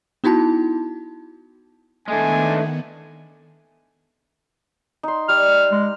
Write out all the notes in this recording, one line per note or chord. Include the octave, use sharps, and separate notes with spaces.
B3 D#4 E4 F#4 A5
D#3 G#3 A3 B3 D4 G#5
D#4 C6
G3 F6
G#3